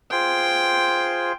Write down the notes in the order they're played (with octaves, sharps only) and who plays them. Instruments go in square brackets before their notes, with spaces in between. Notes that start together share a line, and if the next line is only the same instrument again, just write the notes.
[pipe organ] F4 G#4 C5 [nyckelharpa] G5